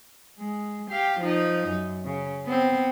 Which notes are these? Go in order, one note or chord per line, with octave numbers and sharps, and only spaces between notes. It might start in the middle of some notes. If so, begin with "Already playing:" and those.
G#3
G4 F5
F3 D#4
F#2
C#3
B3 C4